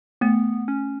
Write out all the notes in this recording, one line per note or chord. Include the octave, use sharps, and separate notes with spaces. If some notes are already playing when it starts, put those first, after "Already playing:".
A3 B3
C#4